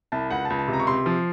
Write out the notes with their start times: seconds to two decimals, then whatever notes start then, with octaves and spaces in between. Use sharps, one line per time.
0.12 C2 A5
0.30 C#2 F#5
0.45 A5
0.50 C#2
0.59 A5
0.68 C3
0.73 A#5
0.80 C#6
0.87 C3 C6
1.06 F3